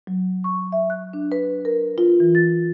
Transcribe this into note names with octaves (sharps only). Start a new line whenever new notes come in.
F#3
C#6
E5
F#6
D4
B4
A#4
F4
E3
A6